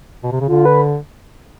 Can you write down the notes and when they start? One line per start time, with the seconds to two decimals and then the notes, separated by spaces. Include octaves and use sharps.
0.23 B2
0.32 C3
0.40 C#3
0.47 D3 F4
0.65 B4